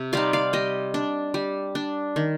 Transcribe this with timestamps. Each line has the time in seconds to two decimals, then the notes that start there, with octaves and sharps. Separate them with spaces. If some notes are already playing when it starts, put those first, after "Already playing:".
Already playing: C3
0.13 G3 C4 D#4 D5 F5
0.33 D5 F5
0.53 G3 D#5 G5
0.94 D4
1.34 G3
1.75 D4
2.16 D#3